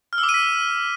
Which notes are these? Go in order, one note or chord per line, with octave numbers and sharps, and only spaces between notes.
F6
E6
D6
D#7
B6